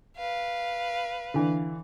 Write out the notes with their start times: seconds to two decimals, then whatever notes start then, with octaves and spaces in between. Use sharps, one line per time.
0.17 B4 F5
1.34 D3 E3